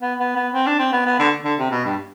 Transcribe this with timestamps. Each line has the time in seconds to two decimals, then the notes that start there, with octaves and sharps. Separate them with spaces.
0.02 B3
0.19 B3
0.36 B3
0.54 C4
0.67 D4
0.79 C4
0.93 B3
1.06 B3
1.19 D3
1.45 D3
1.59 C3
1.71 B2
1.85 G2